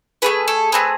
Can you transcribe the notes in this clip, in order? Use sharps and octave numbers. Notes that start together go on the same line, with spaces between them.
A3 C4 G#4 B4
A4
A3 C4 G#4 B4